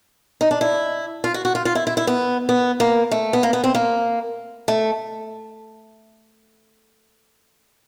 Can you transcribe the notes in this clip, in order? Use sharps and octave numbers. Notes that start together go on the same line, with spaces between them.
D#4
D4
E4
F4
F#4
F#4
F4
F4
E4
E4
E4
B3
B3
A#3
A3
B3
A#3
B3
C4
A#3
A3